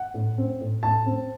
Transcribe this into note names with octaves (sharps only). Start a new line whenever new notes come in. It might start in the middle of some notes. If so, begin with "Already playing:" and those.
Already playing: F#5
A2
C4
A2
A2 A5
C4